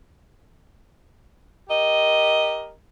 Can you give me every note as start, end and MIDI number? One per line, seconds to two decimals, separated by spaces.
1.69 2.72 67
1.69 2.72 70
1.69 2.72 75